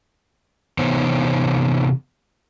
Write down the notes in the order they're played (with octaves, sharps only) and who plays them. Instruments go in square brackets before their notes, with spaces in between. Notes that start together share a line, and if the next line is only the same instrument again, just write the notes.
[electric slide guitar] C3 E3 B3 D#4 C5 C#5